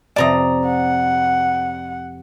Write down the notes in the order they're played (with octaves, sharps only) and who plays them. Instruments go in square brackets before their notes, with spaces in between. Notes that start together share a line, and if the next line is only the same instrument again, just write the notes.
[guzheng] F2 C3 A5 [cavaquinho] D5 A#5 D#6
[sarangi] F#5